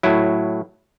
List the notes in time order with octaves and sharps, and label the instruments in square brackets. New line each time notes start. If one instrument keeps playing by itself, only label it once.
[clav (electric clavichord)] A2 F#3 E4